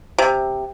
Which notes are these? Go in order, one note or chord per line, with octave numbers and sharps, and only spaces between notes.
C3